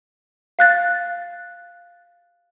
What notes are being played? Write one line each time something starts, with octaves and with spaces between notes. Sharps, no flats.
F5 F#6 A6